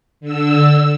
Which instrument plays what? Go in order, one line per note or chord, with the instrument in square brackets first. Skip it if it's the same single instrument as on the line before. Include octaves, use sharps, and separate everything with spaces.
[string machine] D3 E6